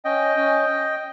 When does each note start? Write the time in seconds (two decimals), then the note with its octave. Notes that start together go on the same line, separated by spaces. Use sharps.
0.05 C#4 D#5 G5
0.37 C#4